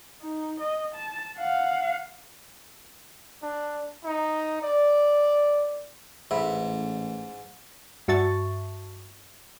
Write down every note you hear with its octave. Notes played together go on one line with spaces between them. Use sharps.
D#4
D#5
A5
F5 F#5
D4
D#4
D5
A1 G#2 E5 B5
G2 F#4 E5 A5 C#6 A6